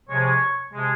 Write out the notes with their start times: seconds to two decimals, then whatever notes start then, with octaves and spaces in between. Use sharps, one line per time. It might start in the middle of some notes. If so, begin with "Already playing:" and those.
0.08 C3 F3 G#3 C#5
0.72 C3 F3 G#3